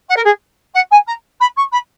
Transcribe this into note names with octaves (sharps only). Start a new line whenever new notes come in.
F#5
A#4
G#4
F#5
G#5
A#5
B5
C#6
B5